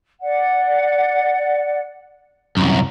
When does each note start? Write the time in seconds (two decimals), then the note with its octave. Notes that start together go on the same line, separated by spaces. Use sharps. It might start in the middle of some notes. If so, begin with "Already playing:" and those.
0.21 D5 F#5
2.57 C2 F#2 A#5